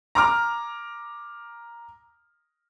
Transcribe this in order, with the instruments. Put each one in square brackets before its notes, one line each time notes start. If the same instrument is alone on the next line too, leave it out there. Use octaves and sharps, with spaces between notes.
[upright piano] A#5 D6 F6